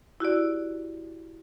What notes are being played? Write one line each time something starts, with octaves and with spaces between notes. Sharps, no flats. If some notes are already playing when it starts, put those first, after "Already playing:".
E4 F#4 G4 D5